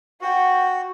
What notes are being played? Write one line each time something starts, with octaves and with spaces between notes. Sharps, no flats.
F#4 F#5 G5